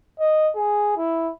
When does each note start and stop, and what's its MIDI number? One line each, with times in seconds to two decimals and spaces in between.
0.20 0.51 75
0.56 0.95 68
0.97 1.31 64